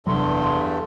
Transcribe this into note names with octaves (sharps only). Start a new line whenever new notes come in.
F#1 E2 G2 C3 F#3 A3 C6